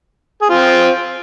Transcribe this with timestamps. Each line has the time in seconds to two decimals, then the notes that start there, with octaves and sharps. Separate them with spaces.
0.42 G#4
0.50 C4 F4